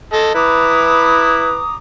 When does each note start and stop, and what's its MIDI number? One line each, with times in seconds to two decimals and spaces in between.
0.13 0.31 69
0.13 0.31 75
0.35 1.61 64
0.35 1.61 71
0.35 1.74 82
0.35 1.74 86
0.35 1.74 87